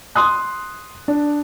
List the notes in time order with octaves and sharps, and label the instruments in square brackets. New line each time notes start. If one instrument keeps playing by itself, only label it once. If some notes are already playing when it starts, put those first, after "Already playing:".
[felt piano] C6 D#6 F#6
D4